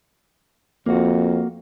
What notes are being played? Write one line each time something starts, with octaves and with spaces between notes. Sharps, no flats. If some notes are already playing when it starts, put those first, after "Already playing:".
F2 A#3 F#4